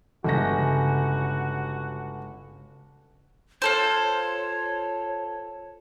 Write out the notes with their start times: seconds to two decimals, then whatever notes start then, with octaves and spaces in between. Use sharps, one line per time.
0.24 G1 C#3 G#3 C#4 F#4 A#6
3.62 F4 A4 C5 C#5